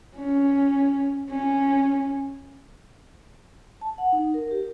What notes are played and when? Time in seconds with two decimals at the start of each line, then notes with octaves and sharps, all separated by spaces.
0.16 C#4
1.30 C#4
3.81 A5
3.98 F#5
4.13 D#4
4.34 A#4
4.51 G4